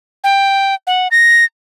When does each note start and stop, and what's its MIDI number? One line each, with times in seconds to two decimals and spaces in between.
0.24 0.74 79
0.87 1.08 78
1.11 1.45 94